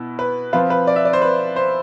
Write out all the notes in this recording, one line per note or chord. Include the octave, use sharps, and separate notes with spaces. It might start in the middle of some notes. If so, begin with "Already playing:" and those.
Already playing: B2 B3 E4
B4
F3 C4 F4 B4
B4
D5
E5
D5
C5
B4
C5